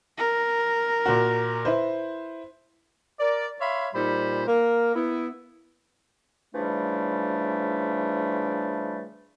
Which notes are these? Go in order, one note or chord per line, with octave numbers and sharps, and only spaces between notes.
A#4
A#2 F#4
E4 B4 C5
A#4 D5
C#5 E5 F5 B5 C6
A#2 G3 D#4 C5 B5
A#3 A#4
B3 E4
C#3 E3 F3 G3 A3 D4